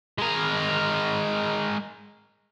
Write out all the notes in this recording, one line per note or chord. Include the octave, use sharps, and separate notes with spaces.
G#3 A#4